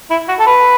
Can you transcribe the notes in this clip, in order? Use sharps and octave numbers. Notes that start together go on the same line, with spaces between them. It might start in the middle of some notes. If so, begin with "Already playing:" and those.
E4
F#4
A4
B4